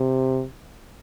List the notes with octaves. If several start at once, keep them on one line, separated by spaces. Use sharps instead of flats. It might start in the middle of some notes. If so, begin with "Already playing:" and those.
Already playing: C3